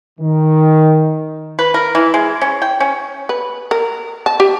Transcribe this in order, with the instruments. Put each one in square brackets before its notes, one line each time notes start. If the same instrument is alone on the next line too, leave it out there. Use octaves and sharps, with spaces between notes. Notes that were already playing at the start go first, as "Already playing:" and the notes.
[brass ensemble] D#3
[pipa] B4
A#4
E3
G#3
C#4
G5
C#4
[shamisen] B4
A#4
A5
G4